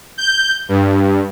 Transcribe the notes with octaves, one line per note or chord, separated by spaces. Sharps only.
G6
G2